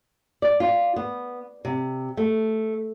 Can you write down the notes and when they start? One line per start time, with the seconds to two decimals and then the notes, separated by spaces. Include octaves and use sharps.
0.42 D5
0.60 F4
0.96 B3
1.65 C3
2.17 A3